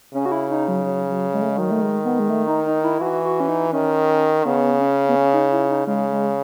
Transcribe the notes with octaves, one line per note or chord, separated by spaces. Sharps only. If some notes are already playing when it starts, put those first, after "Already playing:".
C#3 C#4
F#4
E4
D#4
F#3
F#3
F#3
G#3
A3
G#3
D#3 F#3
A3
G#3
B3
G#3
A3
D#4
D#4
E4
E4
E3 F#4
F#4
C#4
D#4
D#3 C#4
C#3 B3
C#4
B3
C#4
D#4
E4
D#4
C#3 G#3
G#3